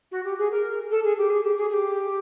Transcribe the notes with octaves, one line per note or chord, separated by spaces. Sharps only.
F#4
G4
G#4
A#4
A4
G#4
G4
G#4
G4
G#4
G#4
G4